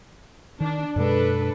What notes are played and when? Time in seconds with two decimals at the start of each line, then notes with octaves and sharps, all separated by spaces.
0.60 D#3 D4
0.96 F#2 B2 G#3 D4 A4 B4